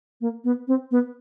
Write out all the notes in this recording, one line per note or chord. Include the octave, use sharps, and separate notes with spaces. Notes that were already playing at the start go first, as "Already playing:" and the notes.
A#3
B3
C4
B3